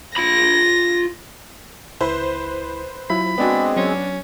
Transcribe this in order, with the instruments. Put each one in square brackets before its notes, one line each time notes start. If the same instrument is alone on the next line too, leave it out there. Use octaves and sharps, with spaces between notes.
[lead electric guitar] F4 B5 [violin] A#6
[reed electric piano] C#2 E4 [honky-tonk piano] B4 C5
[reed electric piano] F#3 E4 F4 [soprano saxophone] B5
[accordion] G#3 C4 [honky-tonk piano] B3 D4 F#4 [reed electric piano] C5
[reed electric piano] F#3 [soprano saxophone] C#4